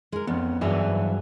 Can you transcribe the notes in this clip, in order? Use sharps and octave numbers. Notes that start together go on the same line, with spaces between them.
G#3 A#4
F2 B3 C#4
G2 E3 F#3 F#4 G#4 E5